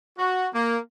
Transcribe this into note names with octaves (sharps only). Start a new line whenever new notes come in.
F#4
A#3